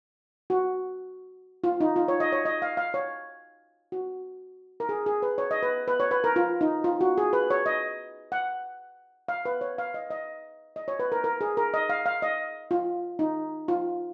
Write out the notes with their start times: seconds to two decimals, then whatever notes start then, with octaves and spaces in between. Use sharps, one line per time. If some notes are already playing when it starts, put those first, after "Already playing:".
0.50 F#4
1.64 F4
1.81 D#4
1.96 F4
2.08 C#5
2.20 D#5
2.32 C#5
2.45 D#5
2.62 F5
2.77 F5
2.94 C#5
3.92 F#4
4.80 A#4
4.89 G#4
5.06 G#4
5.22 B4
5.38 C#5
5.51 D#5
5.63 B4
5.88 B4
6.00 C#5
6.11 B4
6.24 A#4
6.36 F4
6.61 D#4
6.84 F4
7.01 F#4
7.18 G#4
7.33 B4
7.50 C#5
7.66 D#5
8.32 F#5
9.28 F5
9.45 B4
9.61 C#5
9.78 F5
9.94 D#5
10.10 D#5
10.76 D#5
10.88 C#5
10.99 B4
11.12 A#4
11.24 A#4
11.41 G#4
11.57 A#4
11.74 D#5
11.89 F5
12.06 F5
12.22 D#5
12.71 F4
13.19 D#4
13.68 F4